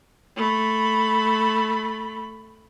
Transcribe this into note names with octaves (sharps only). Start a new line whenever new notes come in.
A3 B5